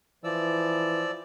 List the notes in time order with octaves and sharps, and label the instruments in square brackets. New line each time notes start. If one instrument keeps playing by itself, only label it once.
[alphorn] E3 [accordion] F3 D5 E6